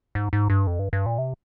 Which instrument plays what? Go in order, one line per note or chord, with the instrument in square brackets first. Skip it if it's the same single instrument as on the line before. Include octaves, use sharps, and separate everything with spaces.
[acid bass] G#2
G#2
G2
F2
G2
G2
A#2
C3